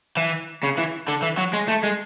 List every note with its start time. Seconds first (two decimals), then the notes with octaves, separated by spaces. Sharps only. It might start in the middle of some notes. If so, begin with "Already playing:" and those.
0.17 E3
0.63 C#3
0.78 E3
1.08 D3
1.23 E3
1.38 F#3
1.54 G#3
1.68 A3
1.84 G#3